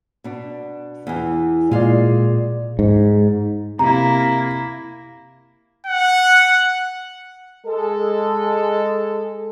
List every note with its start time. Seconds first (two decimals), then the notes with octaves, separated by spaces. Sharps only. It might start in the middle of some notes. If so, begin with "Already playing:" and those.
0.24 B2 D4
1.07 E2 E3
1.71 A#2 G#3 D5 F5
2.79 G#2
3.79 C3 A#3 E4 A#5
5.86 F#5
7.67 G#3 A4